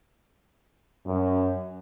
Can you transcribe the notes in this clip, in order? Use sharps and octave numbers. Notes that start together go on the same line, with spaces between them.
F#2